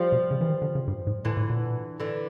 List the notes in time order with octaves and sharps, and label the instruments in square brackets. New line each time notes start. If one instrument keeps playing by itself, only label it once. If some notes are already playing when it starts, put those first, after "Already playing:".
Already playing: [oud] F3 G3
[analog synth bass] B2
C#3
E3
D#3
D3
C#3
G2
G#2
[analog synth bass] A2 [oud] D3 E3
[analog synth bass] A2
A#2
[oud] D3 E3